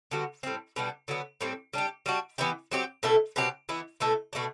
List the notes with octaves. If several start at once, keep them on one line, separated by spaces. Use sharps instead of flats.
D3 G3 B3 F#4
A2 G3 C4
B2 G3 B3 D4
D3 F#3 B3
A2 G3 C4
G3 D4 G4
G3 D4 F#4
E3 B3 E4 G4
F#3 C4 G4
B2 A3 E4 A4
B2 F#3 C4 G4
E3 B3 E4
B2 A3 E4 A4
B2 A3 D4